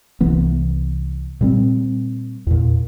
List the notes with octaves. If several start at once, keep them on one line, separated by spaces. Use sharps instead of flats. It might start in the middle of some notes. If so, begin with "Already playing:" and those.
C2 E3 B3
A#2 G3 C4
E2 A#2